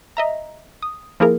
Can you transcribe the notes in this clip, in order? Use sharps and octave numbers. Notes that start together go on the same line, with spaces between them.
D#5 E5 A#5
D#6
F3 A#3 E4 G#4 A#4